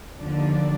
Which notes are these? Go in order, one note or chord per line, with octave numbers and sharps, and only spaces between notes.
D#2 D3 F3 D4